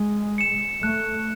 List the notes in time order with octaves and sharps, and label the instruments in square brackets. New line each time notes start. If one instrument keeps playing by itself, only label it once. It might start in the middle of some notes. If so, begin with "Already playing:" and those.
Already playing: [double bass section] G#3
[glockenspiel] C#7 E7
[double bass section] A3 [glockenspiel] F#6